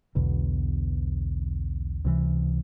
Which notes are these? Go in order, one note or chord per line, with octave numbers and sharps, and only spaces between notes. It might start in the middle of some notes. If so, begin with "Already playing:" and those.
B1 E2 B2 D3
C#2 C3 D#3 E3